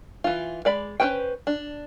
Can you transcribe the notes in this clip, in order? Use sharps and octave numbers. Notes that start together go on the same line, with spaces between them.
E3 F4
G#3 D5 B5
C#4 E4 B4 C5 G5
D4